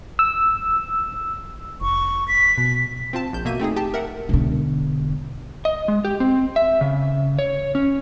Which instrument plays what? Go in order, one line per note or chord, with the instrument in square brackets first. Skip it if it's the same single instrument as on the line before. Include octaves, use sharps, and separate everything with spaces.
[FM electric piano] E6
[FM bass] F1 [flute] C#6
[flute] B6
[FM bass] B2
[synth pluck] C4 F4 A5
A#1 G6
B2 A#3 E5 D#7
A3 C4 D#4 G#4
G4 G5 A5
A#4 E5 F#5
[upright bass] E1 D3
[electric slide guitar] D#5
G#3
G4
C4
E5
C#3
C#5
C#4